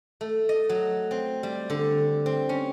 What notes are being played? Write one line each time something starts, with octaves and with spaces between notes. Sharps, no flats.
A3
D#5
F#3
C4
G3
D3
C4
C#4